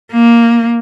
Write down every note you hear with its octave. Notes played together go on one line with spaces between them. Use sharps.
A#3